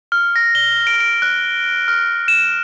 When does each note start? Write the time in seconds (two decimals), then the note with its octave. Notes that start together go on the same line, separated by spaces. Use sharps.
0.12 F6
0.36 A#6
0.55 G7
0.87 D7
1.00 D7
1.22 F#6
1.88 F6
2.28 E7